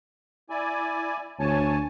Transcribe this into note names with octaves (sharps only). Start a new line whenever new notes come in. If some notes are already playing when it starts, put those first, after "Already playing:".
E4 D5 G#5
D2 C#5 G#5 A5